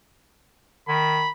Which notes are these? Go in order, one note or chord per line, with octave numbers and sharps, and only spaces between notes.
D#3 B5